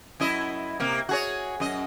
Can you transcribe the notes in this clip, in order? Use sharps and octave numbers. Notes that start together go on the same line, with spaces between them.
F#2 E4 D#5
C3 A#3
F#4 G#4 C#5
F#2 D#5